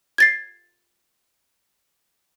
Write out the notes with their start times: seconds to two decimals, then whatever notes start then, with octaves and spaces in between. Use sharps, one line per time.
0.18 G#6 A6 C7